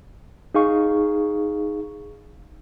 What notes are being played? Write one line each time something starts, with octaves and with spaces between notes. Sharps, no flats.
D#4 G#4 F5 C#6